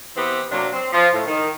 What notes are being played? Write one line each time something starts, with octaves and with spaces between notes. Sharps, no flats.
E3 B3 C4 G4
C3 F#3 A#3 D4
C4
F3
A2
D#3